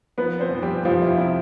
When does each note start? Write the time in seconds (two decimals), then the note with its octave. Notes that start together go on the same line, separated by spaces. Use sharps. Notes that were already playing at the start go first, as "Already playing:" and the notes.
0.18 F3 B3 B4
0.40 C4 C5
0.51 F3
0.63 G3 G4
0.85 F2 F3 F4
1.02 E4
1.18 C3 E4